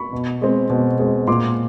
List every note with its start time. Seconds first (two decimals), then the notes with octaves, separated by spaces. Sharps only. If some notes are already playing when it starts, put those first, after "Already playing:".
Already playing: B5 C#6
0.13 B2
0.42 G#3 C4
0.70 B2
0.99 G#3 C4
1.28 A#2 C6 D6